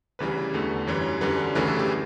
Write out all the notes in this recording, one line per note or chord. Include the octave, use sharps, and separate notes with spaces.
D2 C#3 E3 G3 B4
E2 D3 A3
F#2 E3 G3 C#5
F#2 D3 G3 B4
D2 C#3 E3 A3 B4
A4
G4